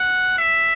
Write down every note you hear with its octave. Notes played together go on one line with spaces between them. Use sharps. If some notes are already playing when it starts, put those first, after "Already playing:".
Already playing: F#5
E5